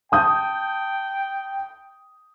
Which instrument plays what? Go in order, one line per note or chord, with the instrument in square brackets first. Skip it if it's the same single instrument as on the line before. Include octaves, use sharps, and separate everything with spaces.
[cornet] G5 [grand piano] A5 D#6 G6